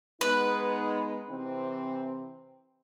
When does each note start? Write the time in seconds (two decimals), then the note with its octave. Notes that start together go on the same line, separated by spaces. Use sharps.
0.21 G#3 B3 D#4 B4
1.29 C3 E3 C4